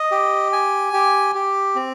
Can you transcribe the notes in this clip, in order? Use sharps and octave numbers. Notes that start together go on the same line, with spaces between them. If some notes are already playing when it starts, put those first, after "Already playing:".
Already playing: D#5
G4
G#5
G4
G4
C4